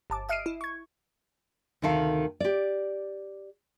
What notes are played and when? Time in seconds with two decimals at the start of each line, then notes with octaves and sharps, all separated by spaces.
0.10 G1 A5 D6
0.29 D#5 E5 F6 C7 D7 D#7
0.46 E4
0.61 C#6 G#6
1.82 D2 C3 D#3 A4 F5
2.40 G4 D5